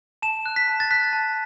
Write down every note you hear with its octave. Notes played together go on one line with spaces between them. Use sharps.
A5 E7
F#6
B6
A5
A6
F#6 B6
A5